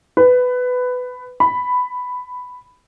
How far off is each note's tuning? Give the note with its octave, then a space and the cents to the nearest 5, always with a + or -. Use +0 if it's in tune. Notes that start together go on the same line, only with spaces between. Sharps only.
B4 +15
B5 +10